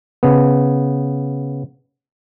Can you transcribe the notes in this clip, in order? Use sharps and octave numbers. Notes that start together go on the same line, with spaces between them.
C#3 B3